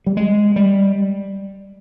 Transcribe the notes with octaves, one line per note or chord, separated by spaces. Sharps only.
G3
G#3
G3